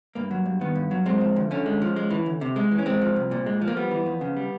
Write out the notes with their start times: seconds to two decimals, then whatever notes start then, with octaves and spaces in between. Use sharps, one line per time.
0.15 G2 A#3
0.31 F#3
0.46 G2
0.61 D#3 B3
0.75 G2
0.91 F#3
1.06 G#3 C4
1.21 F3
1.36 D2
1.51 D3 C#4
1.66 G#3
1.82 F3
1.96 G#3
2.10 E3
2.26 D2
2.41 C3
2.56 G#3
2.71 E3
2.78 C#4
2.86 G#3 C4
3.02 F3
3.16 C2
3.31 A#2
3.46 G#3
3.61 F3
3.68 A#3
3.77 G3 B3
3.91 E3
4.06 F2
4.21 C#3
4.37 G3